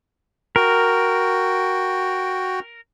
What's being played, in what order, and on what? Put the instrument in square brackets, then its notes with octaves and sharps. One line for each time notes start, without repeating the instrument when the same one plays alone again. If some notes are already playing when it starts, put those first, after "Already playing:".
[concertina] F#4 G5 [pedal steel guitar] A#4